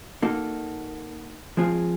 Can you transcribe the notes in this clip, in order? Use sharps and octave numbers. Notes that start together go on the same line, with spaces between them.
A#3 D#4 F#4 A4
F3 G#3 C4 F4 G#4